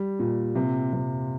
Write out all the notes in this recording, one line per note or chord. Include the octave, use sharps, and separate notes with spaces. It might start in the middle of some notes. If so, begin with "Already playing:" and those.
Already playing: G3
A#2
C3
C3